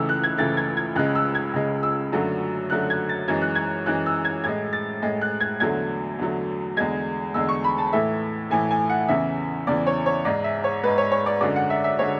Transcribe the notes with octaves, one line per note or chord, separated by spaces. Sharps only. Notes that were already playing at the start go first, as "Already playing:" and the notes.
Already playing: C#2 C#3 E3 A3 E6
F#6
G#6
C#2 C#3 E3 A3 A6
G#6
G#6
C#2 C#3 G#3 F#6
E6
G#6
C#2 C#3 G#3
E6
F#2 D3 F#3 A3
F#2 D3 F#3 A3 F#6
G#6
A6
F#2 E3 G#3 G#6
F#6
G#6
F#2 E3 G#3 F#6
E6
G#6
A2 G#3 G#6
A6
A2 G#3
F#6
G#6
E2 D3 F#3 A3 G#6
E2 D3 F#3 A3
E2 D3 G#3 G#6
E2 D3 G#3 E6
C#6
B5
A5
A2 E3 A3 E5
A2 E3 A3 G#5
G#5
F#5
E2 C#3 E3 E5
E2 C#3 E3 D5
C#5
C#5
G#2 G#3 D5
E5
C#5
G#2 G#3 B4
C#5
C#5
D5
F#2 D3 G#3 D5
F#5
E5
E5
D3 G#3 C#5